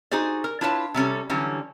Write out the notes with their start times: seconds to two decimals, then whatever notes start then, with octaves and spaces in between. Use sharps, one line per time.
0.11 D#4 F#4 G#4 C5 D5
0.44 A#4
0.61 D4 E4 F4 B4 C#5 A5
0.94 C3 G3 C#4 A4
1.30 D3 E3 F#3 G3 C#4